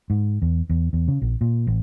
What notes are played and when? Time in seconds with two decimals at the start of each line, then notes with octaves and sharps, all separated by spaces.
0.10 G#2
0.42 E2
0.70 E2
0.93 E2
1.08 C#3
1.22 A#1
1.41 A#2
1.67 A1